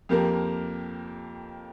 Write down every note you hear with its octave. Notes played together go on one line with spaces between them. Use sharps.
F2 F3 A#3 G4 A#4